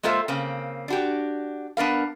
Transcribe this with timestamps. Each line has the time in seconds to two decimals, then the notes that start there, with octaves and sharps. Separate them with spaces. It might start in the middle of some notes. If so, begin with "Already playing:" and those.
0.03 G#3 A#3 F4 A4 C5 E5
0.28 C#3 A#3 C4
0.88 D4 F#4 G4
1.77 B3 D4 A#4 F5